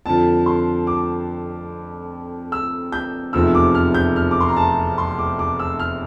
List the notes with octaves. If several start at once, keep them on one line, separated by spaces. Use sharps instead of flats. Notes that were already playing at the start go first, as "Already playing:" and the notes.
F2 D3 F3 A5
C6
D6
E6
G6
F1 E2 C3 F3 E6
D6
F6
G6
F6
D6
C6
A#5
A5
C6
D6
D6
E6
F6